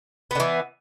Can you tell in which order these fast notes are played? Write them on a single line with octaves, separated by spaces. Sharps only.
B3 D3 E3